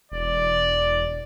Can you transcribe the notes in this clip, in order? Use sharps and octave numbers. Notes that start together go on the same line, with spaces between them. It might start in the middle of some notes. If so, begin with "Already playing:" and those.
E1 D5